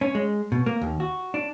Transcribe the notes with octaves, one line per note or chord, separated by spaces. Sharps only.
C#4
G#3
B2
A#3
D#2
F#4
D4